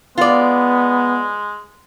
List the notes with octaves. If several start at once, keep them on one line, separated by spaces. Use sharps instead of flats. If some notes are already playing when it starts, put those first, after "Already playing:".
G#3 B3 F4 D5